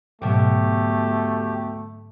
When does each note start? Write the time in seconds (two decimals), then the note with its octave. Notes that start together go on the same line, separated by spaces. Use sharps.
0.22 D2 G#2 B2 D3 F#3 A3 G4